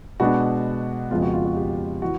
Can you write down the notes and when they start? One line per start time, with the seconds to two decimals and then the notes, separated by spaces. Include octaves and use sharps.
0.20 B2 G#3 B3 D4 F#4
1.11 F2 C#3 F3 G#3 B3 F4
1.23 F#4
1.33 F4
1.45 F#4
1.57 G4
2.02 E3 F#4